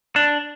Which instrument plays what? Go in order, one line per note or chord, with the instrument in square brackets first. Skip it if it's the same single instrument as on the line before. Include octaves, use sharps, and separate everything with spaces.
[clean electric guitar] D4